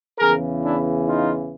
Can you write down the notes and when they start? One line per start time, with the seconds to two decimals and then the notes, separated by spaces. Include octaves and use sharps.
0.19 E2 C#3 E3 G#4 A#4
0.62 D4 E4
1.05 D#4 F4